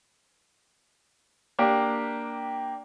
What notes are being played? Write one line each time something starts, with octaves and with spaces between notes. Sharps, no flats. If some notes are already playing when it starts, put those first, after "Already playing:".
A#3 D4 G4